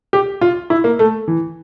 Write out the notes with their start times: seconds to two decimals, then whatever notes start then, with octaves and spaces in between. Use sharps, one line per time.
0.13 G4
0.41 F4
0.70 E4
0.84 A#3
0.99 A3
1.28 E3